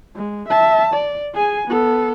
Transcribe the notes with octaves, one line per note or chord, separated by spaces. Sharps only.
G#3
E5 A5
D5
G#4 G#5
B3 A4